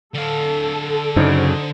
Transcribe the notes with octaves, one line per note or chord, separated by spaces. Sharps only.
D3 A4 F5
F#2 C#3 D4 D#4 C5